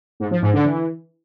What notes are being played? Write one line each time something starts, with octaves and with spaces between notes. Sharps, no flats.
G#2
F3
G#2
D3
E3